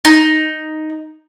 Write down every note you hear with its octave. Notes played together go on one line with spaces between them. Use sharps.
D#4